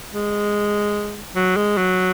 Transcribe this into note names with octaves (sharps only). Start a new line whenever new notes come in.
G#3
F#3
G#3
F#3